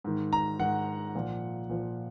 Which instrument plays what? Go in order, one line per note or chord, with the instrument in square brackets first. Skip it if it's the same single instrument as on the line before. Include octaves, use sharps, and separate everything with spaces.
[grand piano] G#2 D#3
A#5
G#2 D#3 F#5
A#2 F3
A#2 F3